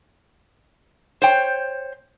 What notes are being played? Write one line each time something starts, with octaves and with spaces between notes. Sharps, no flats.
C5 C#5 G5